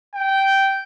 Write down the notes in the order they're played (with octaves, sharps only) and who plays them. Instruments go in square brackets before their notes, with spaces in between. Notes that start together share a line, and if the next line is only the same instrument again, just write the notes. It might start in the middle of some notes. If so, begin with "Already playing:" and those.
[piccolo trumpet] G5